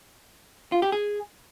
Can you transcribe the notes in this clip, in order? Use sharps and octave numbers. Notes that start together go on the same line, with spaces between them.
F4
G4
G#4